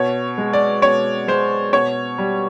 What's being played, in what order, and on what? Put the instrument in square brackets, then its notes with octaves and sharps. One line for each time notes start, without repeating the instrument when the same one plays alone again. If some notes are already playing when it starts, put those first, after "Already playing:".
Already playing: [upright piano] B2 C#5
G#3
D5
B2 C#5
G#3 C5
B2 C#5
G3